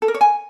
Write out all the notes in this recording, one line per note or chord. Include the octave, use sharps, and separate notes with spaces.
A4
A#4
C#5
G#5